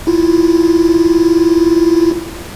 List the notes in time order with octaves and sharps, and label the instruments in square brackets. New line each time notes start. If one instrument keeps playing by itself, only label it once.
[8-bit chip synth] E4 F4